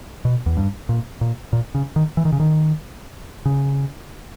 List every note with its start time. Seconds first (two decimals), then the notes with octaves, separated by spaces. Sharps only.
0.25 B2
0.46 E2
0.57 G2
0.89 A#2
1.21 A#2
1.53 A#2
1.75 C#3
1.96 D#3
2.17 E3
2.25 D#3
2.32 C#3
2.40 D#3
3.46 C#3